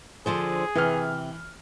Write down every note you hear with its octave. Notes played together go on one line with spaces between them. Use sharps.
D3 F3 G#4 C5
C3 E3 F6